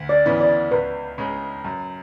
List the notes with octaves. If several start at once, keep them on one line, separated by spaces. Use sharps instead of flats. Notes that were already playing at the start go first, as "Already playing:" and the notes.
Already playing: D2
D5
C#3 E3 B3
D5
C#2 B4
C#3 G#3
F#2